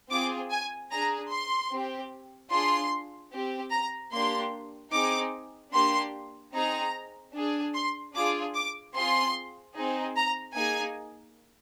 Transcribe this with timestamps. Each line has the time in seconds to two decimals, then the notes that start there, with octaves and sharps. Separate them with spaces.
0.11 C4 F4 G#4 D6
0.51 G#5
0.91 D4 G#4 A#5
1.31 C6
1.71 C4 G4
2.51 D4 F4 G#4 C6
3.32 C4 G4
3.72 A#5
4.12 A#3 D4 G4 C6
4.93 C4 D#4 G#4 D6
5.73 A#3 D4 G4 C6
6.53 C4 D#4 G#4 A#5
7.35 D4 G#4
7.74 C6
8.14 D4 F4 G#4 D6
8.55 D6
8.94 C4 F4 G#4 C6
9.75 C4 D#4 G#4
10.16 A#5
10.55 A#3 D#4 G#4 G#5